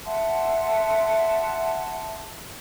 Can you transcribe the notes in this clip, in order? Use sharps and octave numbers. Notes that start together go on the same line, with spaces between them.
E5 F#5 A5 C6